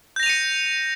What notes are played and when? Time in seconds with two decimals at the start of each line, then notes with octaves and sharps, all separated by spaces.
0.16 G6
0.20 A#6
0.23 F7
0.26 D#7
0.29 C#7